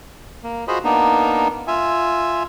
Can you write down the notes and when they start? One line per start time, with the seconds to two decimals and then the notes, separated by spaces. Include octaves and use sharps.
0.44 A#3
0.68 F4 F#4 G#4 C5 D#5 B5
0.84 A#3 B3 D4 D#4
1.67 F4 E5 G#5